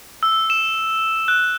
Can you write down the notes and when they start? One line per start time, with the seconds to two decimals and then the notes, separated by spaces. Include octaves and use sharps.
0.23 E6
0.50 E7
1.28 F#6